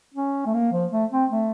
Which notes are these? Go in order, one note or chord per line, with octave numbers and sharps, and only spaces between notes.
C#4
A3
A#3
F3
A3
C4
A3